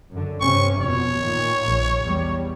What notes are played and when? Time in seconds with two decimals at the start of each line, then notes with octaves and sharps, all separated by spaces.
0.11 F#2 D3
0.41 G2 C3 C#4 C#6
0.81 F1 B2 C#5
1.17 A#2 D#3
1.68 A#1
2.05 E2 G3